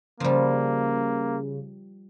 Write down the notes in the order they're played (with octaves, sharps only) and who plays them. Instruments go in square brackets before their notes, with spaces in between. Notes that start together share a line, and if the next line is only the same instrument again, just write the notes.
[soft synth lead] C#3 [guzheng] F3 G3 [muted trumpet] A#3